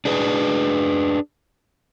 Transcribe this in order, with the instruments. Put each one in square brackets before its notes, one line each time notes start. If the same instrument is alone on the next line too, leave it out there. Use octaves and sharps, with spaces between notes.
[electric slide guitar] D4 G#4 B4